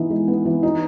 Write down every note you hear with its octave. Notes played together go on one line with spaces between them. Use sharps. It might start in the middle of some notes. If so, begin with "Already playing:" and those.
Already playing: E3 B3 D#4
G#3
B3
E3
D#4